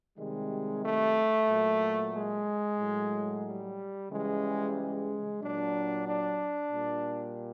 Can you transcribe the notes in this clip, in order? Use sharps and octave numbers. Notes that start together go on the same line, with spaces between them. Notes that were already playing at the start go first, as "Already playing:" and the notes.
C3 D#3 G3 G#3
A3
A#2 F#3
G#3
A2 F#3
G3
C#3 E3 G3 G#3
G#3
A#2 F#3 D4
D4
A#2 G3